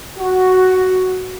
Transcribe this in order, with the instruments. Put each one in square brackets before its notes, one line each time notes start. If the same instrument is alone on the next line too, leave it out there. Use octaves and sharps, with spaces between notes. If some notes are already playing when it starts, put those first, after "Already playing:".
[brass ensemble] F#4